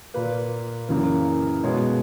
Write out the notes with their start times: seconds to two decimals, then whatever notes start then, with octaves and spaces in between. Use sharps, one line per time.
0.14 A#2 A#3 B4
0.89 F#2 C#3 E3 A#3
1.63 B2 G#3 B3 C#5